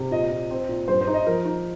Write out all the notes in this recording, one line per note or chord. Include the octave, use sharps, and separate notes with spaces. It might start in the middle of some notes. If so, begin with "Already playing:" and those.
Already playing: C3
A#2 D#5
A#2
C4
A#2
G2 C5
C5
D#4
D#5
F3 A#4
D#4